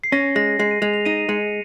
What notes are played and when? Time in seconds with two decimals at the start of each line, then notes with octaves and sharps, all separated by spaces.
0.04 C7
0.12 C#4 A#6
0.36 G#3 A#6
0.59 G#3 C7
0.71 D#7
0.82 G#3 F7
0.94 F7
1.06 D#4 D#7
1.29 G#3 C#7